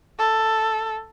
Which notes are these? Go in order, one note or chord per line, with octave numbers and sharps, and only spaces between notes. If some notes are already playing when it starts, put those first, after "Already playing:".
A4